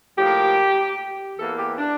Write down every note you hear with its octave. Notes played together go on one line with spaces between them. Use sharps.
A2 F3 A#3 G4
E2 E3 A#3 A4
G4
D4